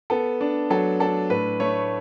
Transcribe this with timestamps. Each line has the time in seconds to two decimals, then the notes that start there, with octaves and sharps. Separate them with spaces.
0.10 B3 A4
0.41 D4
0.70 F#3 A4
1.00 D4 A4
1.30 A2 B4
1.60 A3 C#5